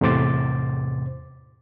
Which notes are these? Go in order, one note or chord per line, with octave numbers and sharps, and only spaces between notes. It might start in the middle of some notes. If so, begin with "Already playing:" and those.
E2 A2 C3 C5 D6 A6